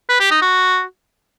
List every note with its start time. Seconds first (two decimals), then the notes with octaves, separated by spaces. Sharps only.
0.09 B4
0.20 G4
0.31 D#4
0.42 F#4